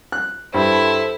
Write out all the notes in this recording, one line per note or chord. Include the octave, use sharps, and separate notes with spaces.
F#6
G2 E4 A4 C5